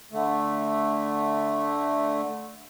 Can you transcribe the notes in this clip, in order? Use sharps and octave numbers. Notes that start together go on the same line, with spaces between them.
D3 A3